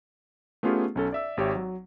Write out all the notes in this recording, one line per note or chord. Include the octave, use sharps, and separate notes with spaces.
A3 B3 C#4 F4 G4 G#4
B1 C#4 A4
D5 E5 E6
G#1 G4 C#5 E5
F#3